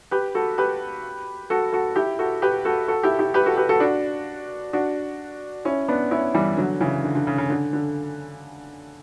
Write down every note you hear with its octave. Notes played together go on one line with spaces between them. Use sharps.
G4 B4
F#4 A4
G4 B4
F#4 A4
F#4 A4
E4 G4
F#4 A4
G4 B4
F#4 A4
F#4 A4
E4 G4
E4 G4
G4 B4
F#4 A4
G4 B4
F#4 A4
D4 F#4
D4 F#4
C#4 E4
B3 D4
C#4 E4
E3 G3
D3 F#3
C#3 E3
D3
D3
C#3
C#3
D3
D3